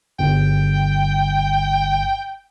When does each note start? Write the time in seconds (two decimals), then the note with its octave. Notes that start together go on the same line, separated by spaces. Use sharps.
0.19 G1 G5